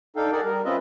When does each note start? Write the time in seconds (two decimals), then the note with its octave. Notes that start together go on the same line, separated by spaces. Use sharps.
0.16 D4 D#4 A4 F5 G5
0.32 G4 G#4 A#4 D5 F#5
0.44 G3 A#4
0.65 C4 C#4 F4 B4 D#5 E5